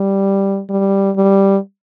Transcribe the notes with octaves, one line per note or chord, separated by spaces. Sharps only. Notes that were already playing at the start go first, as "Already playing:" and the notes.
Already playing: G3
G3
G3